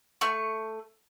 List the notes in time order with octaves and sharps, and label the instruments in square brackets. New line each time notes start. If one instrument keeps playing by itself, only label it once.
[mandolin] A3 C#6